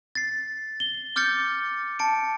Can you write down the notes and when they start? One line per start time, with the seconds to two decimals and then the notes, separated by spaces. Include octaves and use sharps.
0.15 A6 C7
0.80 G7
1.16 D6 F6 G6 A6 C#7
1.99 A5 C#7 D7